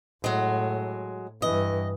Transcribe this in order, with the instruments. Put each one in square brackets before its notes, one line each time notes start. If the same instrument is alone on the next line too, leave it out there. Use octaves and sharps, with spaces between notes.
[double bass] A2 [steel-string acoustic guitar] F#3 G#3
[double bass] G2 E3 [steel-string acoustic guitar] D#5